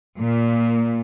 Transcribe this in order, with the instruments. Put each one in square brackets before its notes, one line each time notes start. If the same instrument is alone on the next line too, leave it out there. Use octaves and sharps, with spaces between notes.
[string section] A#2